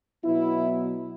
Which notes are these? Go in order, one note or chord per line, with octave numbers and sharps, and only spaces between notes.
B2 F#3 B3 E4